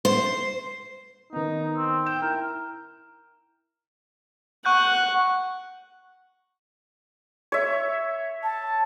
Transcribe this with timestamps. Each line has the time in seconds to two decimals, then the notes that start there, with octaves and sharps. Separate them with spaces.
0.05 C5
1.33 D#3 B3 D#4
1.77 C4
2.06 G5 E7
2.22 E4 A#4
4.65 F#5 C#6 F#6 G6
7.52 C#5 E5
8.43 A5